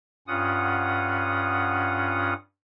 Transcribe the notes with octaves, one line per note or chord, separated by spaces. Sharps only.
G2 C#4 F4 F#5 D#6